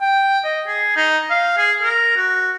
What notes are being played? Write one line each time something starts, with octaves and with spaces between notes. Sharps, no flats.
G5
D#5
G#4
D#4
F5
G#4
A#4
F#4